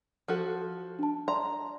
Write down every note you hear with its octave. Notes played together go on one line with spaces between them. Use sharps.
F3 F#4 A4
D4 A5
D5 A#5 C6